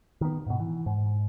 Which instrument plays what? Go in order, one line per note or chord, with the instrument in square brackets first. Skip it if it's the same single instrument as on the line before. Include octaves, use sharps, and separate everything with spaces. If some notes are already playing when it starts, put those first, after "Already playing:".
[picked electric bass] D#3 B3
G#2 B2
E3
G#2